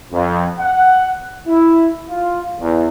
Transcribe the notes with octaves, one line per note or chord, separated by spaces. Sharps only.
F2
F#5
E4
F4
E2